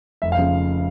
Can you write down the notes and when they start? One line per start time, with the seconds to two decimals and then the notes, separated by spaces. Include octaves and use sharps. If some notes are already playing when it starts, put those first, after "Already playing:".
0.22 F1 E5
0.32 F5
0.38 C#3 F3